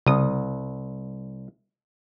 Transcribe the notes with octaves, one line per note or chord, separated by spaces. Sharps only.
C2 C#3 D#6